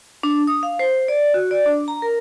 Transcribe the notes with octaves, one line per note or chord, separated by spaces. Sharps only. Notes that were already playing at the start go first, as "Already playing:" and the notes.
D4
D#6
F5
C5
D5
F#4
D5
D4
A#5
A#4